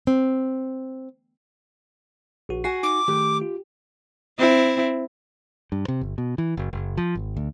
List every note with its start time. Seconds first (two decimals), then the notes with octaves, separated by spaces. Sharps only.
0.07 C4
2.49 A#1 F#4
2.64 F#4 F#5 G#5 C7
2.83 D#4 D6
3.08 D#3 A3 G4
3.42 F4
4.39 C4 E4
5.72 G2
5.88 C3
6.01 G1
6.18 B2
6.38 E3
6.57 F#1
6.73 F#1
6.97 F3
7.15 G#1
7.37 D2